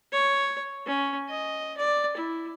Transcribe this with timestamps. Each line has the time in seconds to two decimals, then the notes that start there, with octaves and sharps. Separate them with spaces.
0.12 C#5
0.86 C#4
1.29 D#5
1.77 D5
2.17 E4